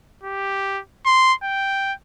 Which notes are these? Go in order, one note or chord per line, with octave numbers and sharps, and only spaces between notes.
G4
C6
G5